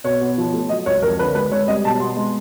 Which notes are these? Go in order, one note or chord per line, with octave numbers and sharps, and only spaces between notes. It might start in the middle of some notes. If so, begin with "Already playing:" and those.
B2 C#5
B3
F3
A3
F#3 D#5
C#2 C#5
F2 A#4
D3 B4
G#3 B4
G#3 C#5
G3 D#5
B2 A5
B3 C6
G#3